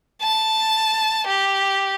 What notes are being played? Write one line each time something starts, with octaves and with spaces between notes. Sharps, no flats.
A5
G4